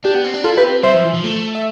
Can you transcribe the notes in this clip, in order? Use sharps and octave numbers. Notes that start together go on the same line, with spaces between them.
D4 G4
B3
C4
D4
E4 F4 A4
G4 B4
C4
G3 C5 E5
F3
E3
F3
A3
E5